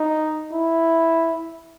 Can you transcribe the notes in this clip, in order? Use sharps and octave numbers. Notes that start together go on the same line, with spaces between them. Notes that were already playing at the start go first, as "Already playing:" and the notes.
Already playing: D#4
E4